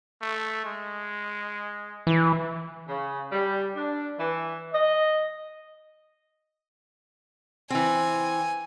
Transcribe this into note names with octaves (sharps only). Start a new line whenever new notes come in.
A3
G#3
E3
C#3
G3
D4
E3
D#5
E3 C4 G#5